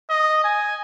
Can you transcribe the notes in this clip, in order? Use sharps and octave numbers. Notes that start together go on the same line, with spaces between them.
D#5
G#5